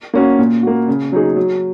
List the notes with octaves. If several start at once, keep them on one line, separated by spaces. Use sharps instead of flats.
A#3 C#4 F#4
A#2
A#3 F#4
C#3
F#3 D#4 G#4
F#3